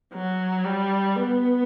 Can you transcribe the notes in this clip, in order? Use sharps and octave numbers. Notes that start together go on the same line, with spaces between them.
F#3
G3
B3